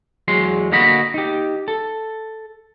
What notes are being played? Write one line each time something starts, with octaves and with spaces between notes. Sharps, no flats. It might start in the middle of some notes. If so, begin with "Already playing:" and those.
E2 F#3 G#3 C6
D3 A#3 F#4 D#5 B5
D#4 G4
A4